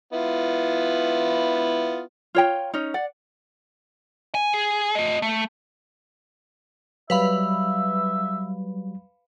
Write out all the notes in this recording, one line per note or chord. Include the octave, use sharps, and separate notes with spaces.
B3 E4 F4
F4 C#5 G5
C#4 D#4
D5 F#5
G#5
G#4
A3 D#5
A3
F#3 G3 B4 E5 F5 B5